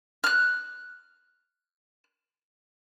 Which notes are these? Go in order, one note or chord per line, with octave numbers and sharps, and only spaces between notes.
F6 F#6